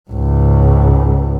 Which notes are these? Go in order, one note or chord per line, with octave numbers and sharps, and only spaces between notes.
C#2 G#2